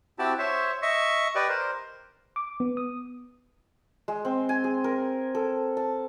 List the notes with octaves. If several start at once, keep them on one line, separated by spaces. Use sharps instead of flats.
C4 E4 F#4 G4 A5
C5 C#5 E5
D#5 E5 C#6
G4 B4 D5 D#5
A#4 C5
D6
B3
D#6
G#3
C4
G#5
G#4
A#4
A4
A5